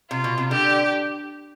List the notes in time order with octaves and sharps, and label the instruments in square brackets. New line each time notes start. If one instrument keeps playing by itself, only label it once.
[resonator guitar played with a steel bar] C3 [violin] F4
[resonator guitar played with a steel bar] B2
C3
[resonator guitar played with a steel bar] D3 [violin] G4